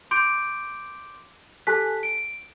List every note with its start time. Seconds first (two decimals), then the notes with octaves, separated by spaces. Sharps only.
0.11 C6 D6 G6 D7
1.67 G4 A4 G#5 A5 F#6 B6
2.03 D7